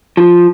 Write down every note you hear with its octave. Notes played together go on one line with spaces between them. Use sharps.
F3